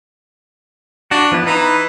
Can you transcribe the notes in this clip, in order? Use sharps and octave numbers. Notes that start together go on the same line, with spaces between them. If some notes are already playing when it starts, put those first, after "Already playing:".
D4 F#4
F3 B3 E4
E3 D#4 A#5 B5